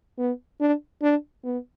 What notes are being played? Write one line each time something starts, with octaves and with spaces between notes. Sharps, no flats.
B3
D4
D4
B3